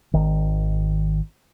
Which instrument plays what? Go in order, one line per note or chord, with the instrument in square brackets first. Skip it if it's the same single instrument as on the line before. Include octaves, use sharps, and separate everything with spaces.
[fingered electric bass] G#1 D#3